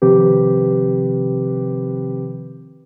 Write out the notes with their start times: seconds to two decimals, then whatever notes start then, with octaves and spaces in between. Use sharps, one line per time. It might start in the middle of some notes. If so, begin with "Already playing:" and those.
0.02 C3 D#3 F3 C4 G4 B4